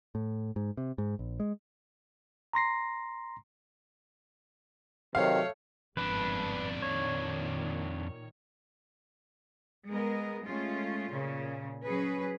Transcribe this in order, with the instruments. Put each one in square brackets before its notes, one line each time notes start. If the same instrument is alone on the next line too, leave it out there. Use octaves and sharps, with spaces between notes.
[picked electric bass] A2
G#2
C3
G#2
A#1
G#3
[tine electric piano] A#5 C6 A#6 C7
[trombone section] C3 D#3 F#3 [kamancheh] A3 C#5 [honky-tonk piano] F5
[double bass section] G1 G#2 [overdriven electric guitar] F2 D4 [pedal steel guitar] B4
[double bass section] A#2 D#3 [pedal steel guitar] C#5
[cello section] G#3 B3 A#4 D#5
G#3 A3 C#4 F4
A#2 C#3 C#4
F#3 C#4 G#4 B4